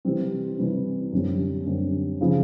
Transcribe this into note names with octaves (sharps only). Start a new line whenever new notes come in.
C3 E3 G3 C4
C3 E3 G3 C4
F#2 D3 G3 C4
F#2 D3 G3 C4
C#3 F3